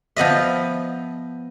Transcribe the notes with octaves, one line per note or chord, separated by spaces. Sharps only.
F3 B3 D#5 E5